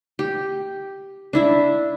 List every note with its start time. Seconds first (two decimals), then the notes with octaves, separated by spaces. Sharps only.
0.19 G4
1.33 D4 E4 E5